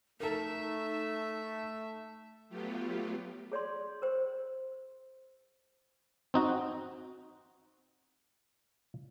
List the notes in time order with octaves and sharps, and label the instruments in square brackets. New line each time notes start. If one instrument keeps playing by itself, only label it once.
[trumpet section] A3 [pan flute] D#4 [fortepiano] A4 A#4 [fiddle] E5
[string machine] F#3 A3 B3 F4 G4
[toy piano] G#4 C#5 D5 C6
A#4 C5
[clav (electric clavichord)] C4 D#4 F#4